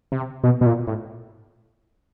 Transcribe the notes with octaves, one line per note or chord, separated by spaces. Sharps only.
C3
B2
B2
A#2
A2